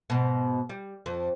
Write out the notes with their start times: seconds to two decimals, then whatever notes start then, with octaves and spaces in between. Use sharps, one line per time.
0.10 G#2 B2
0.69 G3
1.06 F2